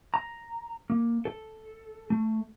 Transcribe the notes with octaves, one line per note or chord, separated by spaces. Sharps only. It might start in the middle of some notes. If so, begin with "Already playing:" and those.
A#5
A#3
A4
A3